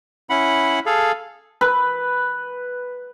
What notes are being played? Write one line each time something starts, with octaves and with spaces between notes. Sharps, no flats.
C#4 E4 F#5 B5
G#4 A4 F5
B4